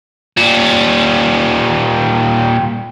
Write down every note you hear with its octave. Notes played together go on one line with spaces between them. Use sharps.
A#2 G3